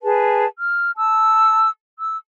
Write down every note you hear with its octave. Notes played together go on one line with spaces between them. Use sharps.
G#4 B4 A5
F6
A5 E6
E6